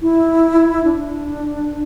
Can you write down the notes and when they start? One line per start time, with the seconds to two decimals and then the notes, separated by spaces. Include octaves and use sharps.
0.01 E4
0.84 D4